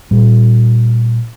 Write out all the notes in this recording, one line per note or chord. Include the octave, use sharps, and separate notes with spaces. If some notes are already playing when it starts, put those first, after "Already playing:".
A#2 G3